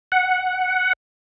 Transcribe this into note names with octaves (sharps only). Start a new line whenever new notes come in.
F#5